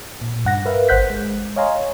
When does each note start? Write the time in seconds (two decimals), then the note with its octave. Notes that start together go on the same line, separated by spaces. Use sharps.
0.21 A#2
0.45 G2 F#5 A#6
0.65 A#4 B4 E5 F5
0.89 G#1 C5 F#5 F#6 G6 B6
1.10 G#3
1.56 C#5 D#5 F5 G#5 A#5 C6